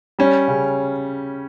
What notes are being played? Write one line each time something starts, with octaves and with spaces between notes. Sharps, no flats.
G3 C#4
C#3